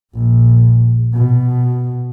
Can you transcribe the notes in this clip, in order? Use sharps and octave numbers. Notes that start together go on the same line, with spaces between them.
A#1
B2